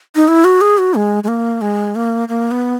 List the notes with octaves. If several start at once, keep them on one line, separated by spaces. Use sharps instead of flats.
D#4
E4
F#4
G#4
F#4
G#3
G#3
A#3
G#3
A#3
A#3
B3